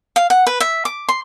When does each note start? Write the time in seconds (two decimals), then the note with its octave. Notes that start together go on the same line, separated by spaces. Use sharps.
0.16 F5
0.30 F#5
0.47 B4
0.60 E5
0.85 D6
1.08 C6